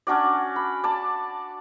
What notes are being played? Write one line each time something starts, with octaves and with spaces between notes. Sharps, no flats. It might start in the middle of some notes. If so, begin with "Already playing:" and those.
C#4 D4 F#4 D5
B5
D5 A5